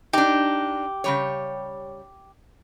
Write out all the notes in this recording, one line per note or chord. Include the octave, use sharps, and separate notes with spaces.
D4 D#4 G4
C#3 G3 C#5